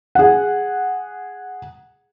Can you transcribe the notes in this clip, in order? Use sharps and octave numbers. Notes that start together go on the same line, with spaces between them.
G#4 F#5